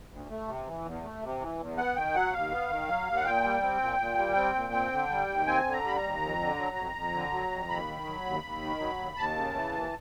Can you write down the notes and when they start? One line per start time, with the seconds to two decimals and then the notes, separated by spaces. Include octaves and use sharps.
0.10 D2
0.30 A3
0.48 C3
0.66 E3
0.85 E2
1.03 A3
1.22 C3
1.40 E3
1.59 E2
1.77 B3 F#5
1.96 D#3 G5
2.14 F#3 F#5
2.33 D#2 F5
2.51 B3
2.70 D#3
2.88 F#3
3.07 D#2
3.16 F#5
3.25 A#2 G5
3.43 G3
3.62 C4
3.81 A#2
4.00 A#2
4.17 G3
4.36 C4
4.55 A#2
4.73 C4
4.92 D3
5.10 G3
5.29 D#2
5.47 C4 G#5
5.66 D3
5.72 A#5
5.84 G3 B5
5.96 A#5
6.03 D#2
6.22 F2
6.40 D3
6.58 F#3
6.77 F2
6.96 F2
7.13 D3
7.32 F#3
7.51 F2
7.69 D#2 B5
7.88 D#3
8.07 F#3
8.25 D#2
8.43 D#2
8.62 D#3
8.80 F#3
8.98 D#2
9.17 D#2 A5
9.36 C#3
9.54 E3
9.73 D#2